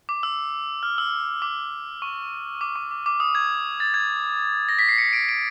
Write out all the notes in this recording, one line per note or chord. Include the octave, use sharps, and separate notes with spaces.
D6
E6
F6
E6
D6
C#6
D6
C#6
D6
D6
D#6
G#6
A6
G#6
A#6
B6
C7
C#7
D7
D7